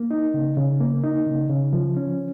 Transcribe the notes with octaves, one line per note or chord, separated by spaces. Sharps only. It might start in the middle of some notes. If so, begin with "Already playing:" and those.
Already playing: A#3
D#4
C#3
C#3
A#3
D#4
C#3
C#3
F3
C#4